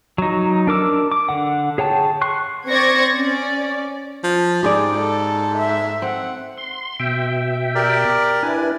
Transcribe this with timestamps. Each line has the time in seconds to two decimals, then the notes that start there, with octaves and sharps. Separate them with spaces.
0.18 F#3 D#4
0.67 D4 A#4 D6 E6
1.12 D6
1.29 D3 F#5
1.78 G#4 C#5 G5 A5
2.21 C6 C#6 F#6
2.68 C4 C5 D5 C#6 G#6 A#6
3.15 C#4 D5
4.23 F3
4.63 G#2 G4 G#4 D5
4.97 A4
5.58 E5
6.02 C4 F#5
6.58 C6
6.99 B2 E5 G5
7.75 G4 A#4 D5
8.43 D4 E4 B4 G#5